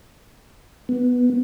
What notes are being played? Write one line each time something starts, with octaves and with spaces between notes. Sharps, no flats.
B3